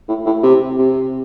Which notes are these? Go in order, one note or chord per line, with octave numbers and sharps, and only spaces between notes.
A2
A2
C3
C3